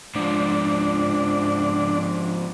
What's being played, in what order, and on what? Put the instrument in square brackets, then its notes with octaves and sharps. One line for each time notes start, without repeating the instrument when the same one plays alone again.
[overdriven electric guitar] G#2 F3 [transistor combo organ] D4